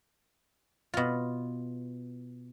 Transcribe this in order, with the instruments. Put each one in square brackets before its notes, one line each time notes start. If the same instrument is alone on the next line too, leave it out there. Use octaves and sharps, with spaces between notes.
[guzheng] B2 F4